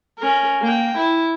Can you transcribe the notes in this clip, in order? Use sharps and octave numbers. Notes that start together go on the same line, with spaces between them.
C#4 A#4
A#3 G5
E4